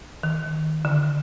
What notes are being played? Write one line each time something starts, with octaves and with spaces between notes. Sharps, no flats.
D#3
D3